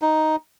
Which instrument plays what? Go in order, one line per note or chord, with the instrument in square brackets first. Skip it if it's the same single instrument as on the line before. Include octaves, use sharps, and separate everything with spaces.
[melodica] D#4